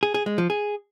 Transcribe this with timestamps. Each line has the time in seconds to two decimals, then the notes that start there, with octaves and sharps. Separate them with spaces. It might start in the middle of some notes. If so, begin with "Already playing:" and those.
0.03 G#4
0.14 G#4
0.26 G#3
0.38 F3
0.50 G#4